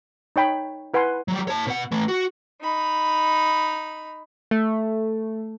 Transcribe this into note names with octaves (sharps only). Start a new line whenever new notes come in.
D#4 C#5 G5 B5
E4 B4 F#5 G#5 C6
F#3 G3
C#5 A5
B2 F#5
E3 A3
F#4
D#4 B5
A3